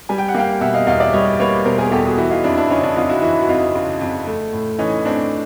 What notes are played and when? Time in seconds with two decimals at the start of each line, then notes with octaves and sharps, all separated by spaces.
0.09 G3 G#5
0.18 G5
0.28 F#5
0.34 A#3 F5 G5
0.61 B2 E5 F#5
0.74 D#5 F5
0.87 E2 D#5 F5
1.00 D5 E5
1.13 G3 C#5 D#5
1.40 A#3 B4 C#5
1.65 B2 A#4 C5
1.78 G#4 A#4
1.92 E2 G4 A4
2.05 F#4 G#4
2.18 E3 E4 F#4
2.30 D#4 F4
2.44 F2 D4 E4
2.57 D4 E4
2.70 C#3 C#4 D#4
2.83 D4 E4
2.96 F2 D#4 F4
3.09 E4 F#4
3.22 E3 E4 F#4
3.41 F#4
3.49 F2 D#4 F4
3.75 C#3
4.01 F2
4.27 A3
4.53 A2
4.79 E3 C#4 D#4
5.05 A2 C4 D4